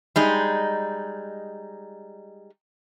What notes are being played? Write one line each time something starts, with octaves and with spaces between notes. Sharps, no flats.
G3 G#3 D#4